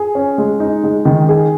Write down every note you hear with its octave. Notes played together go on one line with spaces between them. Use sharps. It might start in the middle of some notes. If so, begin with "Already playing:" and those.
Already playing: G#4
C#4
G#3
D#4
G#3
D#3
G#4